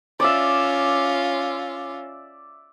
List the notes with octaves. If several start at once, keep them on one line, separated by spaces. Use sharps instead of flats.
C#4 F4 D5 E5